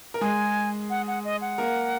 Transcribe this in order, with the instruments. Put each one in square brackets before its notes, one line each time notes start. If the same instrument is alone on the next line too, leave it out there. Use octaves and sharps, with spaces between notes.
[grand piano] A#4
[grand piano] G#3 G#4 [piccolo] G#5
[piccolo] F#5
F#5
D#5
F#5
[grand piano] A#3 A#4